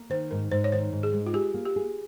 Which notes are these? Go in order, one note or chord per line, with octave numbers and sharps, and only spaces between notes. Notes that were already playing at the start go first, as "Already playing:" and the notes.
Already playing: A#3
D#3 C5
G#2 A#4
G#2 C5
C#5
D#3 C5
G#2
G#4
G#3
F4
G4 G#4
A#3
G4
G#4